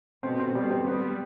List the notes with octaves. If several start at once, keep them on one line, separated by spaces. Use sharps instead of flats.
B2 C4
C4
B2 G3
C4
G3 B3